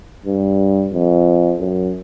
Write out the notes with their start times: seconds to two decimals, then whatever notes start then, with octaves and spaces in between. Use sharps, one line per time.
0.26 G2
0.93 F2
1.60 F#2